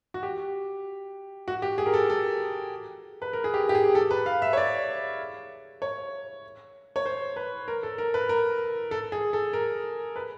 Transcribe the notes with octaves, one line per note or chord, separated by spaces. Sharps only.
F#4
G4
F#4
G4
G#4
A#4
A4
A4
B4
A#4
G#4
G4
G4
G#4
A4
B4
F5
E5
C#5
D5
C#5
C#5
C5
B4
A#4
A4
A#4
B4
A#4
A4
G#4
A4
A#4
B4